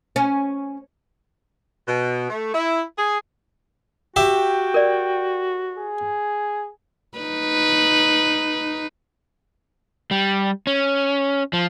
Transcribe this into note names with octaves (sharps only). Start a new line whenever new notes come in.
C#4
B2
A3
E4
G#4
F#4 G4 E5 G5
A#4 D5
G#4
D#4 B4
G3
C#4
F3